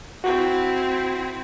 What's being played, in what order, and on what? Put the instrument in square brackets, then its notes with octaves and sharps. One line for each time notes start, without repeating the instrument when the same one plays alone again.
[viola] C4 E4 [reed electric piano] F#4